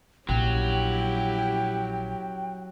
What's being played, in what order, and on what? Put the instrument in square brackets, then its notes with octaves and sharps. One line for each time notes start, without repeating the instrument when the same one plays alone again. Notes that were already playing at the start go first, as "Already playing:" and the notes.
[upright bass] A#1 [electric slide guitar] F#3 [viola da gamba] C#4 E4 G4 [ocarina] G5